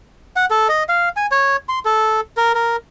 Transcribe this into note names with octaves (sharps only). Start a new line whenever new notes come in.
F#5
A4
D#5
F5
G#5
C#5
C6
A4
A#4
A#4